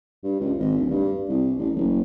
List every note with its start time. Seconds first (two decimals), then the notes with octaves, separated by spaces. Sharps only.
0.24 G2
0.40 C#2
0.58 G#1
0.77 D1
0.90 G2
1.28 C2
1.58 A1
1.75 F#1